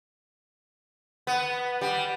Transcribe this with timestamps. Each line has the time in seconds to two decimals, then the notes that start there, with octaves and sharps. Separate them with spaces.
1.27 B3
1.81 G3